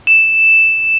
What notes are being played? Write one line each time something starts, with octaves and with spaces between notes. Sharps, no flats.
E7